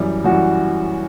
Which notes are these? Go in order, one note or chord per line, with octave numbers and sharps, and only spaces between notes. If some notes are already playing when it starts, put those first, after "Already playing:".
Already playing: F#2 E3 G3
F#2 E3 G3 F#4